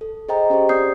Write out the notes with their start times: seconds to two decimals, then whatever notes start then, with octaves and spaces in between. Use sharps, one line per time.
0.01 A4
0.29 G#4 C5 D#5 G5 A#5
0.50 C#4 G4 G#4 C5
0.69 C4 D5 D#6 G6 C7